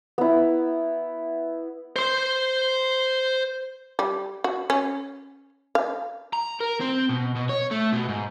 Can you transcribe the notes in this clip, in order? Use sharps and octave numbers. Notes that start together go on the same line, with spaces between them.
B3 E4
C5 C6
G3
F#4
C#4
F5
A#5
A#4
C4
B2
B2
C#5
A3
B2
G#2